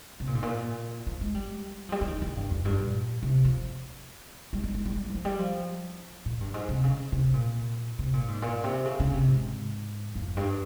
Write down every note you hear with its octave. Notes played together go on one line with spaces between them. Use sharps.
C3
A#2
G#2
A#2
F3
G#3
G3
F3
G3
F3
D#3
D#3
G2
F2
G2
A#2
C3
F3
G3
G#3
G#3
G3
G3
F3
G3
F3
A#2
G2
G#2
C3
C#3
C3
A#2
C3
A#2
G#2
A#2
C3
C#3
C#3
C3
G#2
F2
G2